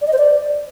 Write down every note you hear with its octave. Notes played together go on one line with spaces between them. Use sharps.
D5
D#5
C5
D5